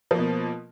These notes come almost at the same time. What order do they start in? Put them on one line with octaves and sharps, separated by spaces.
F3 A#3 B2